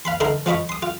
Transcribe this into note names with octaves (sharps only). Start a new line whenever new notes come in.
F5 B5 C6
D3 D#4 E4 A#4 C6
F3 F4 D#5 B5 C#6
C6 D#6
F4